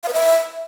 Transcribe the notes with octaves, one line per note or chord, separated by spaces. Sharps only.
F5
B4
E5